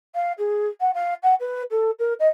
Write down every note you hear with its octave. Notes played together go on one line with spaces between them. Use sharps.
F5
G#4
F#5
F5
F#5
B4
A4
A#4
D#5